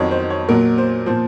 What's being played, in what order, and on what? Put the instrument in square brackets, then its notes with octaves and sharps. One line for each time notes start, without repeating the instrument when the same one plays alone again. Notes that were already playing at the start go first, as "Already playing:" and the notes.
Already playing: [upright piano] F2 D#3 F#3 C#5
C5
C#5
A#2 F#3 A#4
C5
A#2 F3 C5